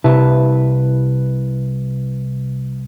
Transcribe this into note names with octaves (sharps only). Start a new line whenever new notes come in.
C2 C3 E4 B4 E5 A5